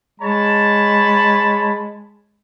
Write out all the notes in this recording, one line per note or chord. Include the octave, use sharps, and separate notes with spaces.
G#3 C#5 A5 B5